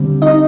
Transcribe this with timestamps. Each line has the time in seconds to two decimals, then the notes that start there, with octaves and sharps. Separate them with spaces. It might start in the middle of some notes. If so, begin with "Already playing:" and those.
Already playing: D3 G3 C4
0.22 D#4 D#5